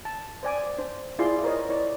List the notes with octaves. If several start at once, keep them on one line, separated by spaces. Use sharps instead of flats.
A5
C5 D5 G#5 D6
D4 C5
D4 E4 F4 G#4 D5 C6
A#4 C5 C#5 D#5
E4 C#5 D5